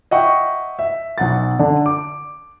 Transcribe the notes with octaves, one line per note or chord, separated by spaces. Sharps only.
D#5 E5 F#5 G5 C#6
E5
B1 F#5 A6
D3 D4
D6